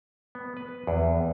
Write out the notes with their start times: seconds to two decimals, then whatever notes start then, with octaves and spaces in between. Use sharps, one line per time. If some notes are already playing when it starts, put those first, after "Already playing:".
0.35 B3
0.57 B4
0.87 E2